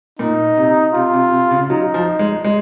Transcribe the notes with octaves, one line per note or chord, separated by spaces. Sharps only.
A#2 D#4
C3
C3 F4
C3
C3
C#3
F#3 D#4
F3
G#3
G#3